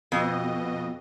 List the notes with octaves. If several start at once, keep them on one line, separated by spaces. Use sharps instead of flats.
F2 B2 B3 D#5